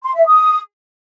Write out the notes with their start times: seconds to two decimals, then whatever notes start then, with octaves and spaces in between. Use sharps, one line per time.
0.04 C6
0.15 E5
0.26 D#6